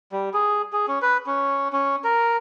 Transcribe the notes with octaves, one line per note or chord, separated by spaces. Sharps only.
G3
G#4
G#4
C#4
B4
C#4
C#4
A#4